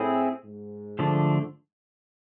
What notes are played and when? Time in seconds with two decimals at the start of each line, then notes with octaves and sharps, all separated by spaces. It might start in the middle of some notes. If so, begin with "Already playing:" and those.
Already playing: A2 C4 E4 G#4
0.45 G#2
0.99 D3 F3 A3 D4